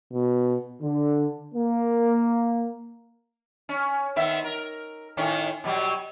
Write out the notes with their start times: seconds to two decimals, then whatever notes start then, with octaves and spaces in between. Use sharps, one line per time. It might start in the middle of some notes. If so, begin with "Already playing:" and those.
0.13 B2
0.82 D3
1.54 A#3
3.69 C#4
4.16 D#3 B3 E5
4.44 A#4
5.17 A2 D#3 C#4
5.64 B2 F#3 G3